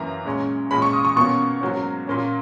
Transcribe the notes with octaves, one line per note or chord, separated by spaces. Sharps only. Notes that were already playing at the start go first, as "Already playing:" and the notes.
Already playing: F#2 E3 A#3 A#5
A#2 G#3 C#4
A#2 G#3 C#4 B5
C#6
D#6
C#6
B2 A#3 C#4 C#6
G#2 F#3 A#3 C#4
A#2 A#3 C#4